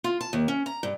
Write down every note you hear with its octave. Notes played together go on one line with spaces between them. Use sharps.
F4
A5
D#2
C#4
A#5
G2